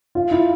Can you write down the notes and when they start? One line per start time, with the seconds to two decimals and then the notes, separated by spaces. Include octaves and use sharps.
0.15 F4
0.31 E4